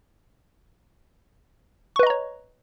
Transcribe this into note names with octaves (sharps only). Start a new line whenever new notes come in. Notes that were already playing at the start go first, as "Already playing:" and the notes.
B4 C#5 D#5 A#5 C#6